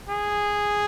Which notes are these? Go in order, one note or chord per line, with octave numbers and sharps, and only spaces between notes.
G#4